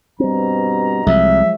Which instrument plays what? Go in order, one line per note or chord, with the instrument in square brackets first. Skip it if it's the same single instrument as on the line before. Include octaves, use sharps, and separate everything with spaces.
[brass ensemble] G2 B2 A#5 [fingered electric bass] G3 C4
[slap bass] C2 [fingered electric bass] F3 F#3 G#3 [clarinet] E5